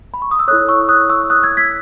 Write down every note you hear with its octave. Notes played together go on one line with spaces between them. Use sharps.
B5
C#6
D#6
E6
E4 A4 C#5 D#6 F#6
C#6 E6
D#6 F#6
C#6 E6
D#6 F#6
E6 G#6
G#6 B6